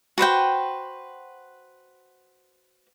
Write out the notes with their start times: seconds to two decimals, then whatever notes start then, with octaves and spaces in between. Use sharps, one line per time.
0.18 F#4 B4 C5 G5